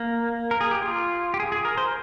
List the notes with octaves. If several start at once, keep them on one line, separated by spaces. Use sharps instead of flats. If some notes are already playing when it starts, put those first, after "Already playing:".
Already playing: A#3
A#4
G#4
G4
F4
G4
G#4
G#4
A#4
C5